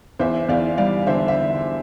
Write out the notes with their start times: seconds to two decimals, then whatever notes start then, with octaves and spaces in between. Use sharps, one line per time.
0.19 E2 C5 E5
0.48 E2 D5 F5
0.78 G3 D5 F5
1.06 D3 C5 E5
1.28 E5